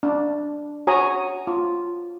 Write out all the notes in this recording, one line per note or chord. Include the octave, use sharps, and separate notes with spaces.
D4
F#4 C#5 G#5 A#5 D#6
F4